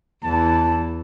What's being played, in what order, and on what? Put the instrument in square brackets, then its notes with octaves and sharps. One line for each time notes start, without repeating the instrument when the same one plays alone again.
[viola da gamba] E2 E3 [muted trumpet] A5